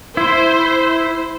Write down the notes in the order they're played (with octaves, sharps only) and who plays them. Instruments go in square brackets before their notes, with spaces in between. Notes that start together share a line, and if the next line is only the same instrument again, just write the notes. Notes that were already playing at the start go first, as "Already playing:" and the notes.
[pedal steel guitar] E4 [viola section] C5